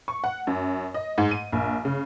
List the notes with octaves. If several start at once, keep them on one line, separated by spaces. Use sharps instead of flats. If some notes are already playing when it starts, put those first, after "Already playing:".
C#6
F#5
F#2
D#5
G#2
D#7
A#1
C#3